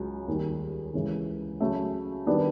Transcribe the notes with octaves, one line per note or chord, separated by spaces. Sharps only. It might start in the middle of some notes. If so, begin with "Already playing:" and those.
Already playing: C#2 C#3 F#3
D#2 D#3 G3
C#2 C#3 E3
C#3 F#3 A3
D#3 G3 B3 D4